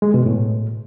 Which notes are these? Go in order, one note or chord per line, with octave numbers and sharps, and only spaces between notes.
G#3
B2
A2